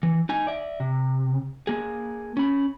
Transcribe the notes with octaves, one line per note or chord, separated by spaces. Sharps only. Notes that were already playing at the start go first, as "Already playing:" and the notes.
E3
D#4 G#5
D5 E5
C3
A#3 G#4
C#4 B5